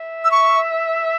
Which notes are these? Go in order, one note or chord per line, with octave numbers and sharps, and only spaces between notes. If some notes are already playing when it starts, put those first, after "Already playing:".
Already playing: E5
E6
C#6